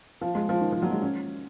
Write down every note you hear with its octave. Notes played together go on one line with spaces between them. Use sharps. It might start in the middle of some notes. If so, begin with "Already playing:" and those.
F3
G#3
F3
D#3
F3
F#3
G#3
C#4